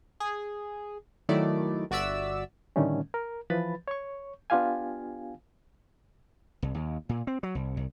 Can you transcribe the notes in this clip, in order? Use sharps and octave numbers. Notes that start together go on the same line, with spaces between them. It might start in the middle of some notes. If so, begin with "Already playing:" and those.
G#4
D#3 F#3 A3 E4 D5
G1 F#4 D5 E5 E6
A2 D3 D#3 G3 A3 C#4
A#4
E3 F3 B4 B5 A6
C#5 C#6
B3 D4 F4 G4 F5 G#5
C2
D#2
A#2
C4
F#3
C2
C2